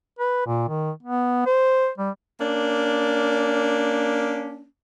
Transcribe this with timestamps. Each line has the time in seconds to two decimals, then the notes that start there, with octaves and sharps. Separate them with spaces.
0.19 B4
0.47 A#2
0.68 D#3
1.03 B3
1.46 C5
1.98 G3
2.40 A#3 C#4 D4